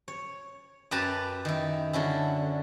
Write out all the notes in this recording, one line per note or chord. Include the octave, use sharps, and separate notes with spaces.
C#5
F#2 G4 B4 A5 A#5
D#3 E4
D3 F#3 C#4 E4